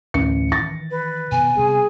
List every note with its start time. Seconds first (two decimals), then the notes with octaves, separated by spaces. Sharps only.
0.14 A1 D2 C#7
0.52 D#3 E3 A6 A#6
0.90 B4
1.32 B2 D#3 B3 G#5
1.55 C3 G3 B3 G#4